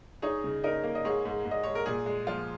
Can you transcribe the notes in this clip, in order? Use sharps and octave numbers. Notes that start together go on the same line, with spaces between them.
D#4 G#4 C#5
C#3
D#4 A#4 D#5
A#3
D#5
G#2 G#4 C#5
G#2
G#2
D#5
G#2 C#5
A#4
A#2 G#4
G#3
F3 F4